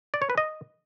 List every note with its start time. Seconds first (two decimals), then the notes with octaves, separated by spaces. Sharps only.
0.14 D5
0.22 C#5
0.30 B4
0.38 D#5